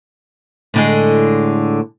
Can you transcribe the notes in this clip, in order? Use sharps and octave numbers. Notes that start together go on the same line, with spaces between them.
A2 D3 G#3